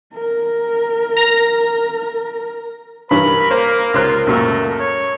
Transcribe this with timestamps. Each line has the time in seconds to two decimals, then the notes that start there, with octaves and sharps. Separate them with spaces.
0.14 A#4
1.17 A#5 A#6
3.11 G2 E3 A#4 B5
3.51 A#3 C5
3.94 C#2 F4 C5 F#6
4.27 C#2 F#2 A#2 A3
4.80 C#5